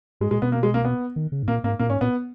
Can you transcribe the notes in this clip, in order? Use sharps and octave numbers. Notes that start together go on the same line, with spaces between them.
G#2 G#3
A#2 G#3
B2 B3
A#3
G#3
A#3
B3
D#3
C#3
G#2
A#2 A#3
G#2 A#3
A#2 A#3
G#2 C#4
A#2 B3